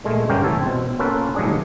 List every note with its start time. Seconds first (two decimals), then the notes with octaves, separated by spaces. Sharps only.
0.04 A#2 G#3 A3
0.29 G2 D3 C#4 G4 A#4 G5
0.43 C#2 E3 A3 A4 C#5
0.61 B2 C4
0.99 A#3 C#4 F4 A4 B4
1.35 A2 D#3 F#3 G3 D4 G#4